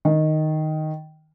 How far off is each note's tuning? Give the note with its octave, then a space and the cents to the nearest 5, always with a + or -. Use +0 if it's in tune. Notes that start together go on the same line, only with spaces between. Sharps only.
D#3 -5